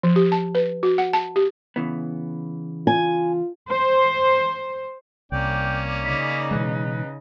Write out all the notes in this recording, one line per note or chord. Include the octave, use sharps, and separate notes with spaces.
F3
G4
A5
B4
F#4
F#5
A5
G4
C#3 E3 B3
F4 G#5
C5
C2 C3 A#3 C#4 D5 G5
C#3 D#4 B5
B2 E3 G#3 B4